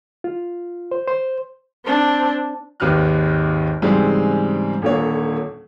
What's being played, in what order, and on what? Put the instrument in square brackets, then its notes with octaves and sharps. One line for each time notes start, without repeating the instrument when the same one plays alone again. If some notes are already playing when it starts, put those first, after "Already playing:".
[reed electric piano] F4
C5
C5
[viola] C4 D4
[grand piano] G#1 D#2 G4 B4 F6 F#6
G#2 C#3 E3 G3 G#3 C4
D#1 A#2 D3 A#3 C#5